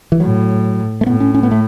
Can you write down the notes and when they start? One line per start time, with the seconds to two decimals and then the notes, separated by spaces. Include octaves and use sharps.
0.12 E3
0.20 A2 F#3
1.01 A3
1.06 A2 B3
1.20 C#4
1.35 C#4
1.43 B3
1.51 A3